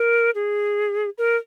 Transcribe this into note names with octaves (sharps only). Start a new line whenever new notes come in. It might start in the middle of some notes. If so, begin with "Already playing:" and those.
Already playing: A#4
G#4
A#4